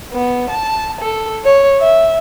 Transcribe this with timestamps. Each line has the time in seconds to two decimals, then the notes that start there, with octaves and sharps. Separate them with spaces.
0.12 B3
0.50 A5
1.01 A4
1.44 C#5
1.81 E5